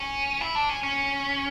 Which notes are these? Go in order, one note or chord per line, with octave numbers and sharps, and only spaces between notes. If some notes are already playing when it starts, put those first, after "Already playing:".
Already playing: C#4
E4
D4
C#4
C#4